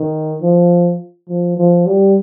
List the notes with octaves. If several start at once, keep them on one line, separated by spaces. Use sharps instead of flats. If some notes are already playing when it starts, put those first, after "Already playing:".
Already playing: D#3
F3
F3
F3
G3